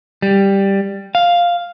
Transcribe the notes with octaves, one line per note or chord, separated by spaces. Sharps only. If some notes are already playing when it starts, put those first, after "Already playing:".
G3
F5